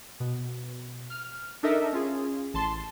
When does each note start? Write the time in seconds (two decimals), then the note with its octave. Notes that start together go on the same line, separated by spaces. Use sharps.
0.20 B2
1.10 F6
1.63 D4 D#4 A4 A#4 D#5 E5
1.93 C#4 F4 G#4
2.54 A1 A5 C6